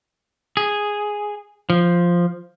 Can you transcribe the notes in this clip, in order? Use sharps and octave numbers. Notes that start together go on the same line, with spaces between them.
G#4
F3